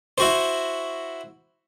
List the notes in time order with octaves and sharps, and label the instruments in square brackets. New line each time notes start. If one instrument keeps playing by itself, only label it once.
[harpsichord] E4 F#4 C5